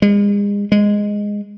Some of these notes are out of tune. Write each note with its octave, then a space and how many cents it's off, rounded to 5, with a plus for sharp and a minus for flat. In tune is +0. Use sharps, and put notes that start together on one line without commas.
G#3 -40
G#3 -10